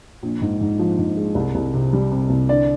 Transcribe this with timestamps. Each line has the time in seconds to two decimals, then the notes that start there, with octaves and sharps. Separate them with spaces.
0.23 A#1
0.42 G#2
0.61 G#2
0.79 F3
0.99 G#2
1.17 G#3
1.35 C2
1.55 C2
1.74 C3
1.93 G3
2.12 C3
2.30 C2
2.49 D3 D5